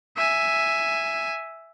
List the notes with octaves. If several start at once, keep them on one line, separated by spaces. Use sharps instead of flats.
E5 G#5